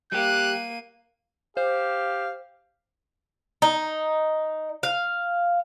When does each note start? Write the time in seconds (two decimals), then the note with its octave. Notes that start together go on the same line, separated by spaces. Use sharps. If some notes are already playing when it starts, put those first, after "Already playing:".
0.12 G3 A#3 G4 F#6 D#7
1.57 G4 C5 F5
3.62 D#4
4.83 F5